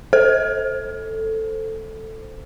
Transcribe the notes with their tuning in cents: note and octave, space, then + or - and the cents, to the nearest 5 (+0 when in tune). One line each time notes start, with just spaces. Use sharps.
A4 +5 C5 +0